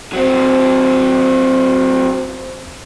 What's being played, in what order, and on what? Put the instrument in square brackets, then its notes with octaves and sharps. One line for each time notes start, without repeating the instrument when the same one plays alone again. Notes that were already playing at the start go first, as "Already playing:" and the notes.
[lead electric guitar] F#3 C4